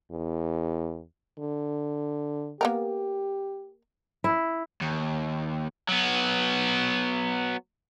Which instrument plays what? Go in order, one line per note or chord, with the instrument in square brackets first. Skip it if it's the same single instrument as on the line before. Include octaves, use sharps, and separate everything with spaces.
[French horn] E2
[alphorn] D3
[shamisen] A#3 B3 A#4 [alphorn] G4
[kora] E4
[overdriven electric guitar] D#2
F#3 B3